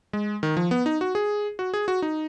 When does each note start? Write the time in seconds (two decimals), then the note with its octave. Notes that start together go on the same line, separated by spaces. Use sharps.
0.13 G#3
0.43 D#3
0.57 F3
0.71 B3
0.86 D#4
1.01 F#4
1.15 G#4
1.59 F#4
1.74 G#4
1.88 F#4
2.02 D#4